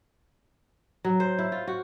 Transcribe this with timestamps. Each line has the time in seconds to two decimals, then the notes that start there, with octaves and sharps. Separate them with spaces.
1.05 F#3
1.20 C5
1.39 E4
1.52 F4
1.67 F#4